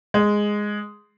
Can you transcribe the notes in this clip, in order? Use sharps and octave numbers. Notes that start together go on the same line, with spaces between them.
G#3